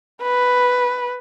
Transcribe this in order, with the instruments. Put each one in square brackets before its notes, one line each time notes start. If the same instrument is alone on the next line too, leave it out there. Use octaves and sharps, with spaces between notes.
[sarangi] B4